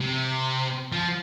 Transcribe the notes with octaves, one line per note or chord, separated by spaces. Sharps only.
C3
F3